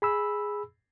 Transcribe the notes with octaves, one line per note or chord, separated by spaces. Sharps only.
G#4 B5 E6